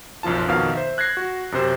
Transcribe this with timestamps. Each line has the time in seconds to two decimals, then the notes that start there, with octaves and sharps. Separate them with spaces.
0.23 B1 F#2 F3 F4 A5
0.48 F2 B2 D#3 F5
0.73 C5 E5
0.98 F#6 G#6 A#6 C7
1.17 F#4
1.52 F#2 C3 C5